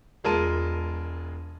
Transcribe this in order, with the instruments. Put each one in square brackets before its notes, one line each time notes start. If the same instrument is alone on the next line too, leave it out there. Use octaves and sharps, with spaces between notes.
[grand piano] E1 G#3 F4 A#4 A5 D#7